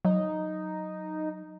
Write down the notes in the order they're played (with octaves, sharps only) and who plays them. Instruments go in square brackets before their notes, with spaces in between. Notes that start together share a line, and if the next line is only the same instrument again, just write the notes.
[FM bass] F#3 [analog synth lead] D#4